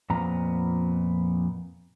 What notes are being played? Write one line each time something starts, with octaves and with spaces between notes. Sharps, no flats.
F2 A#2 B3 A#5